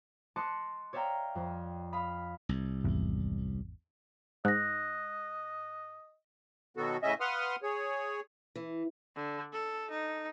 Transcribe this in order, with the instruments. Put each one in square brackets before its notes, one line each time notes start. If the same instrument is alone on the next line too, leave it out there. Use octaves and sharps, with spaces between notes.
[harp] D#5 A5 C6 D6 F#6 C#7
C#5 D5 E5 F5 G5 A#5
F2
F5 B5 D#6 B6
[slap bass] C2
[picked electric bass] G#1 E2
[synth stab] G#2 [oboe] D#5 [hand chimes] F#6 A#6
[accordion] B2 D#3 F#3 B3 F#4 A4
A2 C#3 C#4 D#5 E5
B4 F5 F#5 C6 D#6 F6
G#4 C#5
[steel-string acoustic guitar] E3
[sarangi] D3
A4
D#4